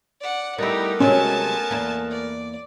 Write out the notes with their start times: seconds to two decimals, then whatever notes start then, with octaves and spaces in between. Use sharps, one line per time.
0.20 D5 F#5
0.58 G3 A3 B3 D#4 E4 G4 A#4
1.00 C3 F#3 G#3 C#4 G#5 A5
1.71 E2 A#3
2.10 D5